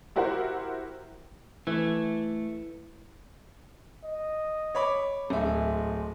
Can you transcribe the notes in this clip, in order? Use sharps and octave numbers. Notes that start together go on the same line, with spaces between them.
E4 F#4 G4 A#4 C5 F#5
E3 A3
D#5
C#5 B5 D6
D1 G#3 E5